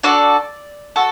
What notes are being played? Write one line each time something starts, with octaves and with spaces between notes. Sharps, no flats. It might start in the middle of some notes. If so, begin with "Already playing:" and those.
D4 F#4 A4 D5
F#4 A4